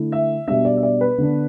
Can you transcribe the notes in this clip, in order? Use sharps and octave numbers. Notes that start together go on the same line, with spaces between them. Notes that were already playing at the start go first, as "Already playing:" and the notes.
Already playing: D3 A3 E4
E5
B2 G3 D4 E5
D5
E5
D5
B4
D3 B3 D4